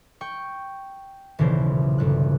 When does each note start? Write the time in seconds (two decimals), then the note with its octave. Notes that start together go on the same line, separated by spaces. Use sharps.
0.21 G5 C#6
1.39 D#1 B1 C#3 E3 C5
1.98 G1 F#6